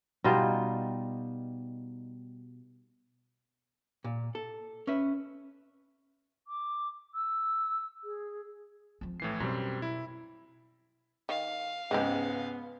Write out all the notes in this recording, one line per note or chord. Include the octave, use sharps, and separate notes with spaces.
B2 G3 D#4 F4
A#2
A4
C#4 B4 E5
D6
E6
G#4
F3 C4
A2 E3 C7
F#2 B2 G3 C4
E4
D#3 F5
C#2 G#2 G#3 B3 C4 G4